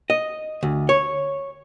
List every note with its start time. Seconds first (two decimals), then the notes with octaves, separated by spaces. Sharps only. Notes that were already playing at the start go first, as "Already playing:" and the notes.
0.10 D#5
0.63 D2
0.89 C#5